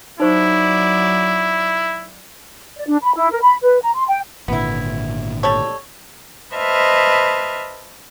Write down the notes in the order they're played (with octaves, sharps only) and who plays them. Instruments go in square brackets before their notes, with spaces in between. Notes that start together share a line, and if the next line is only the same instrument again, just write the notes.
[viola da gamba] F#3 D5 [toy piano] D#4 C5 C#6 [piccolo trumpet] E4
[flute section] D5
D4
B5
E4
A#4
B5
B4
A#5
C6
G5
[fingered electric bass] G#1 A#2 D3 [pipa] B3 E4
[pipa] G3 A4 C#5
[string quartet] B4 C5 D#5 E5 A5 F6